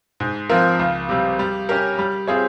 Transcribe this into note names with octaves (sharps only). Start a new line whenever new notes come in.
G#2
F3 C4 F4 A#4
C#2
C3 G3
G3
C#4 G4 A#4
G3
C4 F4 G#4 C#5